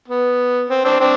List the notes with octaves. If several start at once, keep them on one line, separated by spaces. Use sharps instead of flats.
B3
C4
C4 D4
C4 D4